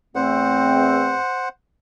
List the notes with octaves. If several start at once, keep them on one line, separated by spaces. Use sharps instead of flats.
E2 A3 C4 C5 F#5